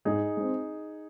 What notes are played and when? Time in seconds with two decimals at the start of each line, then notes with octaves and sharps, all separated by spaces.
0.05 G#2 D#4 G#4
0.37 G#3 C4